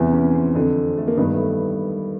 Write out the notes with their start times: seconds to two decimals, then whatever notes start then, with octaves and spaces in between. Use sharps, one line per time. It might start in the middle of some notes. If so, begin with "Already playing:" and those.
Already playing: E2 C3 E3
0.13 C#4
0.34 C4
0.55 F2 D3
0.97 A3
1.07 A#3
1.17 G2 D#3 B3
1.34 A3